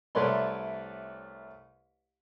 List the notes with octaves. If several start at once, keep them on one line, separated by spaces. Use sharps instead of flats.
C2 A3 B4 C#5 D5 C6